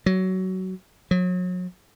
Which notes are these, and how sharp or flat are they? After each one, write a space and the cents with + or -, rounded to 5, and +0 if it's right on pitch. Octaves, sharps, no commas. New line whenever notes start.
F#3 +15
F#3 -35